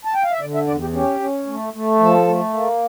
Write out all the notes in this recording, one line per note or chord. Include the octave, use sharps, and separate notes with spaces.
A5
G5
F5
E5
D3 D5
E5
E2 D5
G4
C#4 G4
C#4
A3
A3
F3 A4
A3
A#3